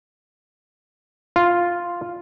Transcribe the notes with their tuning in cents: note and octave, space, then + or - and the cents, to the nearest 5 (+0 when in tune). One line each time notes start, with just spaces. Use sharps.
F4 +0